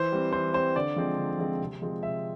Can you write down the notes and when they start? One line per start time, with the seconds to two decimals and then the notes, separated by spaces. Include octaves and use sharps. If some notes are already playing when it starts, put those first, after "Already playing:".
Already playing: E3 C5
0.12 G3 C4
0.32 E3 C5
0.54 G3 C4 C5
0.75 D3 D5
0.96 F3 G#3 C4
1.18 D3
1.39 F3 G#3 C4
1.60 C3
1.82 F3 G#3 C4
2.03 C3 E5